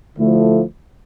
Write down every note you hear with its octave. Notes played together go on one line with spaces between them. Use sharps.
D2 D3 F3 A3 E4